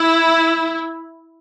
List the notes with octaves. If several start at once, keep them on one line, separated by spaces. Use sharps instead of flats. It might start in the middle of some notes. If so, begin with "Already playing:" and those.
Already playing: E4